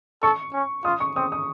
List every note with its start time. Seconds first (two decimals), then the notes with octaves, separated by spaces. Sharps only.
0.23 A4 C#6
0.54 C#4
0.85 F4 D#6
1.00 C#6
1.16 C4 D#6
1.32 D#6